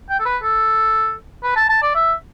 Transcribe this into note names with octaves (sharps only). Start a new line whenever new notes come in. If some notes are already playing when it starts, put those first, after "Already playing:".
G5
A4
B4
A4
B4
A5
A5
D5
E5